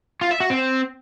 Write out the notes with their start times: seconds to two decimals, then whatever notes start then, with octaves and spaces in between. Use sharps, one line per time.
0.21 F4
0.31 E5
0.40 F#4
0.50 C4